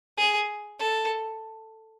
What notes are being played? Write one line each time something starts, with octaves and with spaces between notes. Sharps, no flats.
G#4
A4